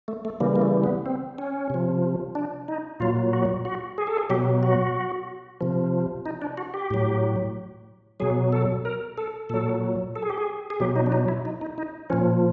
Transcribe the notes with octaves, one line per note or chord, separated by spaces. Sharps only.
A3
A3
C#3 E3 G3 A#3
A#3
A3
B3
C4
C#4
C3 F3
D4
D#4
A#2 F#3 F4
F#4
F#4
G#4
A4
G#4
B2 F#3 G4
F#4
C3 F3
D#4
D4
F#4
G4
A2 F#3
B2 F#3 G#4
A4
A#4
A4
A#2 F#3 A4
A4
G#4
G4
G#4
G#4
B2 F#3 G4
D#4
D4
D#4
E4
D#4
D#4
D#4
A#2 F3 C#4